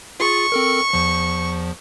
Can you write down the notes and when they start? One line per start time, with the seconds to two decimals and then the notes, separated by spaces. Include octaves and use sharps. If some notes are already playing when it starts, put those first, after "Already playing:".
0.20 F4 G#4 C#6 A6
0.52 C4 A4 A#4
0.93 E2 F3